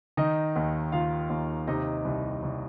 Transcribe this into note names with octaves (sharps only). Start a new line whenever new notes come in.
D#3 D#4 D#5
D#2
D#3 F4 F5
D#2
C3 D#4 D#5
C2
C2